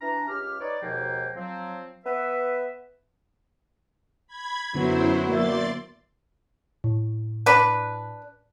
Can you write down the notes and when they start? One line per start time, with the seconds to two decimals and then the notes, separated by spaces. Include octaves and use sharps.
0.01 E3 D4 A#5
0.28 C#2 G4 F6
0.60 D#4 B4 C#5 D5
0.82 D#2 G#2 B2 F3 A#3 G5
1.36 F3 F#3 C4
2.05 B3 B4 E5
4.27 B5 G#6
4.75 F#2 D3 F#3 B3 E4 C5
5.29 A#3 D5 E5 C6 A6
6.84 A2
7.46 D4 B4